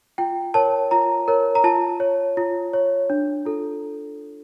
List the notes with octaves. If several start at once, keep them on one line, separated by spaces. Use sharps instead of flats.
F4 G5
A#4 C#5 A5
F4 A#5
A#4 C#5
A#5
F4 A5
C#5
F4
C#5
D4
F4 A4